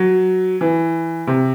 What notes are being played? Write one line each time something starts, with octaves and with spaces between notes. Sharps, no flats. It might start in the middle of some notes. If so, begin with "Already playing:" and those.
Already playing: F#3
E3
C3